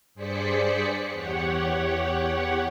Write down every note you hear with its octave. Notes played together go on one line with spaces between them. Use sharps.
G2 G#4 C5 D5 B6 C#7
E2 G4 C#5 F#5